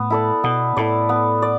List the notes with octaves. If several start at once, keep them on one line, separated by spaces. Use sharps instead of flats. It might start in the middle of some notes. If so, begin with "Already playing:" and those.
Already playing: A2 B3
E4 A4 D5
B2 B3
A2 E4 A4 D5
B3
D5